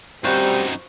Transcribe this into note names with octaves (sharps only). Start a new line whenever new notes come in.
F#2 G3 C4 D#4 F4 F#4 C5